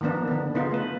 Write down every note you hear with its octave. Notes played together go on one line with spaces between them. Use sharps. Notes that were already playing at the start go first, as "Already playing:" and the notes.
D#3 F3 A#3 B3 D4
D3 B3
C#3 B3 D#4 F4
A3 B4